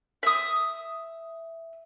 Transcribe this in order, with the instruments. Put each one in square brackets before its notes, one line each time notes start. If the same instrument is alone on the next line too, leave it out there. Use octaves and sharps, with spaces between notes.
[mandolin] E5 D#6